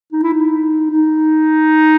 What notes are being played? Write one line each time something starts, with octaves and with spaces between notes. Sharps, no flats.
D#4
E4
D#4
D#4